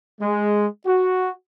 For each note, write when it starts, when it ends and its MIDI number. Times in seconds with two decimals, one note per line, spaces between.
0.21 0.66 56
0.85 1.30 66